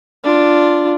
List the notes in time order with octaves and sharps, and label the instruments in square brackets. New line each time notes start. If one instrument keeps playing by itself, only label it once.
[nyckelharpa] D4 F4